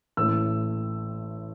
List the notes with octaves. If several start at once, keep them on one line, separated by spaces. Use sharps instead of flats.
A1 A2 A3 E6